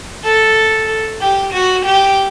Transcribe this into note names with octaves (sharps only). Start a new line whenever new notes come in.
A4
G4
F#4
G4